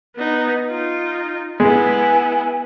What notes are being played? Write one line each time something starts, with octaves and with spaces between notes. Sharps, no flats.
B3 D#4
D#4 F4
G#3 B3 E4 G#5